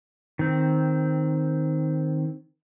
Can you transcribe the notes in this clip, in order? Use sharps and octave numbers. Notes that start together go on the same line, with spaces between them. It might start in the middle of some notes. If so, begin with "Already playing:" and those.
D#3 C4